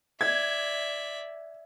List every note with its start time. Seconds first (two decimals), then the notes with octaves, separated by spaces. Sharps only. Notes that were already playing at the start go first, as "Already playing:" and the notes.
0.21 D5 E5 G#6